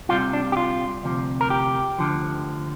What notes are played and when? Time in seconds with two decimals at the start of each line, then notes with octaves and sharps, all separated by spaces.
0.09 C2 C3 G3 F4
0.33 D4
0.52 G4
0.57 F4
1.03 D2 C3 F3
1.41 A#4
1.50 G4
1.98 D2 D3 F3